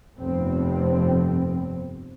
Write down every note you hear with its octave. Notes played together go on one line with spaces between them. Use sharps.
F1 G2 F3 B3 C4